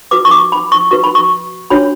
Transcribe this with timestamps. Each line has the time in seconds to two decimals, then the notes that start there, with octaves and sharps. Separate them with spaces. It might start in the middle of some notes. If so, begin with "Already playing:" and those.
0.11 F#4 B4 D6
0.25 C#6
0.31 D6
0.52 B5
0.72 C#6
0.91 F#4 B4 C#6
1.04 B5
1.15 C#6
1.70 D4 F#4 C#5 B5